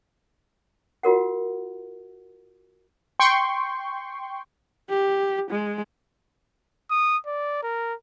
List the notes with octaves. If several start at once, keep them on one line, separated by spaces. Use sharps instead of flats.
F4 F#4 A#4 F#5
G5 C6 C#6
G4
G#3
D#6
D5
A#4